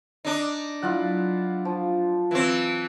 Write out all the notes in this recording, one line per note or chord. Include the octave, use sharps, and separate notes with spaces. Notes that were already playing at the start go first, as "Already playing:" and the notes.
D4 D#4
F#3 A3 E4 F4 F#5
F3
E3 C4